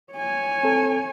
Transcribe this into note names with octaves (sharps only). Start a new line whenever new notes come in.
C#5 G#5
C4 A4